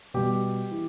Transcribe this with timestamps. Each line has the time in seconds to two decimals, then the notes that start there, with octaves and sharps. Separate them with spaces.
0.14 B2 G3 G4
0.71 E3